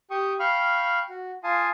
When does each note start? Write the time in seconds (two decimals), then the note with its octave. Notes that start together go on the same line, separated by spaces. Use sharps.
0.11 G4 G5 C#6 D#6
0.40 F5 G5 B5 C#6 F6
1.09 F#4
1.44 F4 F5 G#5 A5 D#6